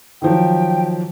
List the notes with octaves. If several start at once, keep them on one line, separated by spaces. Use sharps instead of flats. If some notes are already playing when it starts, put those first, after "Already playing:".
D#3 F3 F#3 G5